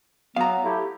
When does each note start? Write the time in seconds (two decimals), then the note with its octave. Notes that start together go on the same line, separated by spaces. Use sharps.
0.37 F#3 B3 F5 A#5
0.64 A3 E4 G4